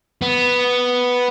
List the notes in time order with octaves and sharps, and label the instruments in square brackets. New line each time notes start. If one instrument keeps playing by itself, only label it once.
[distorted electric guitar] B3